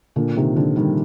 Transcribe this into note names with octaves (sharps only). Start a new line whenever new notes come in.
A#2 D3
C3 D#3
D3 F3
D#3 G3